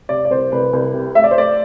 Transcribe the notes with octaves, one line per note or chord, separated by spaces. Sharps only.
C3 D5
D5
C2 C5
C2 B4
C2
C3
A3 E5
D5
C5
A3 D5